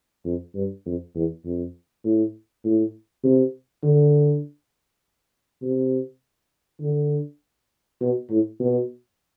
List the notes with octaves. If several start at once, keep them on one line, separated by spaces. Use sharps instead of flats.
F2
G2
F2
E2
F2
A2
A2
C3
D3
C3
D3
B2
A2
B2